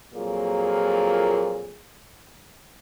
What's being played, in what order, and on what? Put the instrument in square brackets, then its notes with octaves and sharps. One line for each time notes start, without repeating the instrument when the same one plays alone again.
[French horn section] F2 A#2 F#3 A#3 F4 G#4